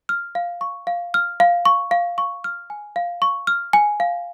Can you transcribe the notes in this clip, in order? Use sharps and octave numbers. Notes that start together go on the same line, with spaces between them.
F6
F5
C#6
F5
F6
F5
C#6
F5
C#6
F6
G#5
F5
C#6
F6
G#5
F5